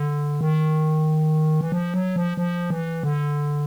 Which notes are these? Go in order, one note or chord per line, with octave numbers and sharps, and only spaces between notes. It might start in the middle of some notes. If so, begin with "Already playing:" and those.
Already playing: D3
D#3
E3
F3
F#3
F3
F3
E3
D3